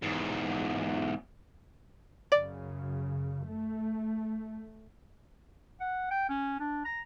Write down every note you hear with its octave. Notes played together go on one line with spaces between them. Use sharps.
E2 G#2
F#2 C#3 D5
A3
F#5
G5
C#4
D4
A#5